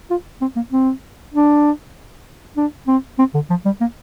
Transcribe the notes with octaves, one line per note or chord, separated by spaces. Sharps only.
F4
C4
A#3
C4
D4
D4
C4
C4
D3
F3
G3
A#3